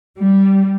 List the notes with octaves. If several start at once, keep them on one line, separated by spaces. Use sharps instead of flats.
G3